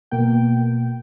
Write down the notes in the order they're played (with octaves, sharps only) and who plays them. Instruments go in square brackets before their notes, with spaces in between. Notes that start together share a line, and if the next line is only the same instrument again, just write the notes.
[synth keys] B2 A#3 G5